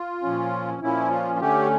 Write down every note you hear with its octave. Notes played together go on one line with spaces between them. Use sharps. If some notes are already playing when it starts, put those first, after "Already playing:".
Already playing: F4
A#2 F3 C#4
A#2 F3 C#4 E4
F4
F4
D3 A3 C#4 G4